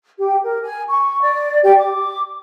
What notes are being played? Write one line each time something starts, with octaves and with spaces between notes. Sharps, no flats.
G4
A#4
G#5
C#6
D5
G4
D6